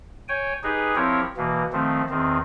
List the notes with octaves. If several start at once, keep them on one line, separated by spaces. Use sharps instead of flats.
C#5 G5 G#5
D#4 G4 G#4 B4
F3 C4 E4 G4 A#4 C#5
B2 E3 A#3
D#3 F3 A3 C4
E2 D#3 C4